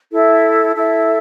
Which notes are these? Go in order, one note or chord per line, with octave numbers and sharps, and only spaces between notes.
E4 A4 E5
E4 A4 E5